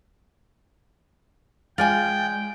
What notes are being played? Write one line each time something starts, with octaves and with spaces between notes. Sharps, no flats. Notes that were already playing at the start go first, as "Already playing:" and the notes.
G#3 F4 D5 G5 G#5